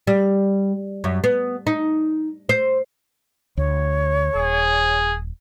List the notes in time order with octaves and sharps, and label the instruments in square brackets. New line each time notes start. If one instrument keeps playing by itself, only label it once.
[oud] G3
F#2
B3
D#4
C5
[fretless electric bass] D2 [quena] C#5
[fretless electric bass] D#1 [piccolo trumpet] G#4